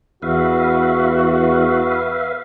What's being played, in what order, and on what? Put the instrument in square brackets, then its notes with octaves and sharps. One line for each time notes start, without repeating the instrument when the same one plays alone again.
[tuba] E2 [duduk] F#4 [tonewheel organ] B4 E5 F5